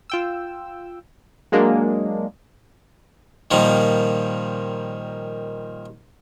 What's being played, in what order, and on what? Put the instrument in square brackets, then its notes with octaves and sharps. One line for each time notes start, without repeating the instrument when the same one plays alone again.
[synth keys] F4 G5 E6
F#3 G#3 A#3 D4
[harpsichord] A#2 D#3 F3 G3